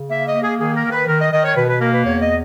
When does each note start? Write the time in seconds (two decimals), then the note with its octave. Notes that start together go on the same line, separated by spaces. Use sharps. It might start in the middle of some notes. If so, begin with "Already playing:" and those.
Already playing: C#3
0.10 A#3 E5
0.27 D#5
0.34 A#3
0.43 G#4
0.58 D#3 G#4
0.75 A#4
0.84 D#3
0.91 B4
1.07 D#3 A#4
1.20 D#5
1.32 D#3 D#5
1.44 C#5
1.56 B2 B4
1.69 B4
1.81 A#3 A#4
1.93 B4
2.05 E2 C#5
2.21 D#5